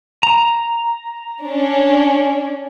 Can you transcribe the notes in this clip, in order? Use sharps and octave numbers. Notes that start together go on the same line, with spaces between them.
A#5
C#4 D4